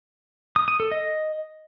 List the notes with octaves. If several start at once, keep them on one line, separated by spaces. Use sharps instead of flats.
D#6
D#6
A4
D#5